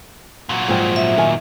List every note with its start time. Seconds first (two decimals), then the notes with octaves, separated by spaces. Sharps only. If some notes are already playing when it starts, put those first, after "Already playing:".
0.49 A#2 F#3
0.68 G#2 F3 G5
0.96 E5
1.18 D#3 G#5